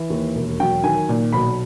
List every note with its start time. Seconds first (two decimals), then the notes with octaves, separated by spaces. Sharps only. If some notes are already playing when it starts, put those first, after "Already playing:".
Already playing: E3
0.10 D#2
0.35 E1
0.60 F#3 G5
0.83 D#3 G#5
1.09 A#2
1.33 B1 B5